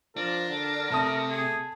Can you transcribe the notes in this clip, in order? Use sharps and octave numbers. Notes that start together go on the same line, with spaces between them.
F3 D4 A#4
D3
C3 A3 A5 D#6
G#4